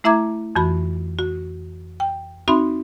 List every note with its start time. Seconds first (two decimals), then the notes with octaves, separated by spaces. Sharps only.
0.04 A3 E4 E5 A#5 D6 G#6
0.55 F2 E3 F#4 B5
1.19 F#4
2.00 G5
2.48 C4 D#4 F#4 E5 B5 C6